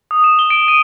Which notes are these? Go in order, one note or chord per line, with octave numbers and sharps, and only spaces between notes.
D#6
E7
G7
D7
D#7